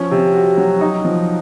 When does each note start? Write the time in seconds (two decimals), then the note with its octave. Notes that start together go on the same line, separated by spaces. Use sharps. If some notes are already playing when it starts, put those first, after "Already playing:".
Already playing: F3 C#4
0.11 C3
0.34 F#4
0.58 F#3
0.81 D#4
1.05 F3